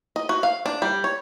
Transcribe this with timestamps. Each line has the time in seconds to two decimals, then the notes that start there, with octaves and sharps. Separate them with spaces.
0.16 D#5
0.29 F#4
0.43 F5
0.66 D4
0.82 G3
1.04 C#5